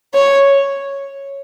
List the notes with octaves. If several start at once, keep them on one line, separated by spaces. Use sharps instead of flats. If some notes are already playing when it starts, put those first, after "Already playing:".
C#5